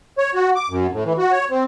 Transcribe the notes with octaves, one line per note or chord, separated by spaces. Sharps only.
C#5
F#4
D6
F#2
A2
E3
F#4
C#5
C4